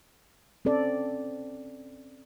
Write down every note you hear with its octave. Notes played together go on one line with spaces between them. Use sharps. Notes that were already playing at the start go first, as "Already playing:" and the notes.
C4 C#4 A4 D5